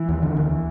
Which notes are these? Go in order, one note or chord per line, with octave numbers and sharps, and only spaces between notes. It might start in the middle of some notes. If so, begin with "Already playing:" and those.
Already playing: E3
D#2
D3
D#2